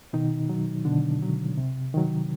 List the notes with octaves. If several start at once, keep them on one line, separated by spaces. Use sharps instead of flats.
B2 D#3 D#4
F#3
B2 D3 D4
F#3
C3
D#3 F#3